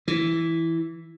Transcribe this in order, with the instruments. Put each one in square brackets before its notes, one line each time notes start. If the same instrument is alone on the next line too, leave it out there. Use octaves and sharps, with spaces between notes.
[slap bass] E3